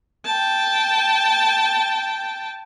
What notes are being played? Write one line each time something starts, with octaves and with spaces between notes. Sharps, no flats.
G5 A5